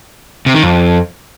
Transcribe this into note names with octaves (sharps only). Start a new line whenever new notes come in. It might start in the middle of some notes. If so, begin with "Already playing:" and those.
C3
D#3
F2